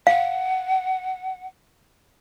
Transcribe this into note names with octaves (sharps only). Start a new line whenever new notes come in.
F5 F#5